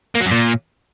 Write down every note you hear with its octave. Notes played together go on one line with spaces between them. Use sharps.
A#3
F#3
F#2
A#2